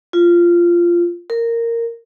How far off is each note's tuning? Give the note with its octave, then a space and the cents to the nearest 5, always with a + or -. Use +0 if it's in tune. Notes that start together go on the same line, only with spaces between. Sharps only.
F4 -15
A#4 -10